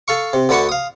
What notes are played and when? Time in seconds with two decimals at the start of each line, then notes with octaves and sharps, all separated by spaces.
0.08 A4 F5 C#6
0.33 C3
0.49 D2 D3 B4 F#5 A5 C#6
0.69 F5 D#6